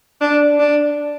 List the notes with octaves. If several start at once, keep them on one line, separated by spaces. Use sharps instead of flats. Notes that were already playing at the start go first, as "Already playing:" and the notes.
D4
D4